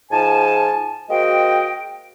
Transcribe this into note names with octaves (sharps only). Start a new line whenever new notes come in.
G#2 F3 G#5 A5
G#3 A#3 F#4 C5 D#5 G5